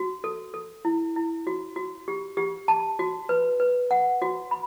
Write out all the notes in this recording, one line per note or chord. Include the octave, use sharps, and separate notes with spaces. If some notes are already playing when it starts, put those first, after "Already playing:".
Already playing: F#4
A4
A4
E4
E4
F#4
F#4
G4
G4
A5
F#4
B4
B4
F#5
F#4
B5